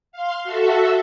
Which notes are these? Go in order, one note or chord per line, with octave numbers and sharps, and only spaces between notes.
F5 C6
F#4 A4 E5